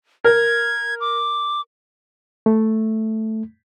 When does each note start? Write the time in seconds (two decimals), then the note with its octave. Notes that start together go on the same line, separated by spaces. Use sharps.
0.24 A#4 G#6
1.01 D6
2.46 A3